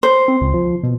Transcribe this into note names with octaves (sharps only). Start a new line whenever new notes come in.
C5
C4
C#2
F3
B2